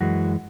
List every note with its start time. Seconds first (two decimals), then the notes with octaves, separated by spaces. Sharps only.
0.01 F#2 E3 G#3 F#4